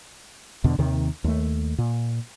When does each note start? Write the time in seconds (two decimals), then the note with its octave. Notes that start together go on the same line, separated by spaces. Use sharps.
0.64 E2 B2 D3
0.78 D#2 C3 D#3
1.24 D#2 A3
1.78 A#2